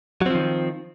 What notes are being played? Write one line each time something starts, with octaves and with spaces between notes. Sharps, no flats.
D#3 F3 F#3 C4